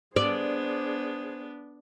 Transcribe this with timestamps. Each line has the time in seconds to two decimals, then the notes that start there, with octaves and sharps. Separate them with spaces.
0.16 B3 D4 G#4 C5 D5